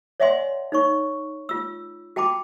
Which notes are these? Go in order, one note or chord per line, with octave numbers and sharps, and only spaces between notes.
C#5 D5 E5 F#5 G#5 C6
D#4 C#5 C#6
F4 E6
F#4 G5 A5 B5 D6